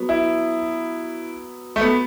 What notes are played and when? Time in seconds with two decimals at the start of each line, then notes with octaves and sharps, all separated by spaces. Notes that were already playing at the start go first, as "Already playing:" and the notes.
Already playing: F#3 B3
0.09 E4
1.76 A3
1.81 B3